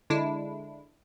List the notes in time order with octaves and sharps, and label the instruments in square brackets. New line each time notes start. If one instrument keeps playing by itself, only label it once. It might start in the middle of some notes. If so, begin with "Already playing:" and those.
[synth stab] D3 G#3 D4 E4